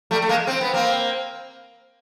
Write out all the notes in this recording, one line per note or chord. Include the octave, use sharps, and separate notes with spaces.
G3 A3
A3
G#3 A#3
C4
B3
A#3 C4